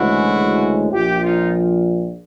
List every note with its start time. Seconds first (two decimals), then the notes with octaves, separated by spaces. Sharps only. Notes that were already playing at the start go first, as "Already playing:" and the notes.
Already playing: D2 C#3 E3 G#3 E4 F#4
0.91 A#1 A#2 F3 F4 G4
1.22 D#4 F4